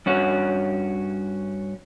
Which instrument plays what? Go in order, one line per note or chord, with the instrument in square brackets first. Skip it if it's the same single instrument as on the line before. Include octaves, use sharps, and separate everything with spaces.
[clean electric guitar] G2 C#4 F#4